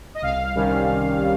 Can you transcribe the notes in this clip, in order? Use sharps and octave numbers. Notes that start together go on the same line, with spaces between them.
D#5
C2 F5
C3 D#3 G3 C#4
C2
C3